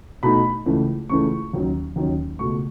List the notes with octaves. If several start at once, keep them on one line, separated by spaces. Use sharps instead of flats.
B2 A3 D#4 B5
C#2 C#3 E3 A3
C#2 C#3 E3 A3 C#6
D#2 D#3 F#3 C#4
D#2 D#3 F#3 C#4
C#2 B2 A3 C#6